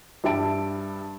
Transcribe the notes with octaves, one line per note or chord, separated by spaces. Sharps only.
G2 G3 E5 A5 D7